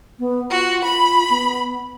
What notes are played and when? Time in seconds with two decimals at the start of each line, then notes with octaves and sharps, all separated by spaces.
0.19 B3
0.50 F4 F#4
0.84 F4 B5
1.30 B3